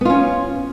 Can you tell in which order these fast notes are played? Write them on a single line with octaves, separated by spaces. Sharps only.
B3 F4 C#4